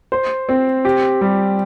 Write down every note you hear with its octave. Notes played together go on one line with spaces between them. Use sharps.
C5
C4
G4
G3